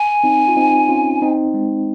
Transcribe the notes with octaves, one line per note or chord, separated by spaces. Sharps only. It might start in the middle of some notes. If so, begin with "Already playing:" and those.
Already playing: G#5
C4 D#4
F4
C4 D#4
C#4 F4
C4 D#4
G#3 C4